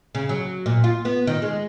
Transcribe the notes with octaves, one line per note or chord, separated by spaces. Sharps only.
C#3
F#3
A#2
F4
B3
D#3
G#3